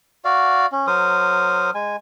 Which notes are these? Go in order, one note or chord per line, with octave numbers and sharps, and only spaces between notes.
F#4 D5 F5
C#4
F#3 A#4 C5 D#6
G#3 G#5